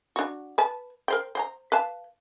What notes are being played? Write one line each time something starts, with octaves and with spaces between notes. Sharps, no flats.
D4 F#4
B4 A5
A#4 C5 G5
C5 G5 A#5
B4 F5 A5